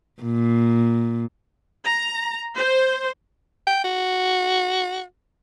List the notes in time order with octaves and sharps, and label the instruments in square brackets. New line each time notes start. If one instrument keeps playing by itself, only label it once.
[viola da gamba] A#2
[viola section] A#5
C5
[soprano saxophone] G5
F#4